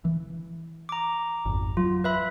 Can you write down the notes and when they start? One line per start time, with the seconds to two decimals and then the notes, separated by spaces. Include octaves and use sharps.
0.05 E3
0.89 A#5 D6
1.46 G#1 F2
1.77 F#3 F4
2.04 B4 E5 B5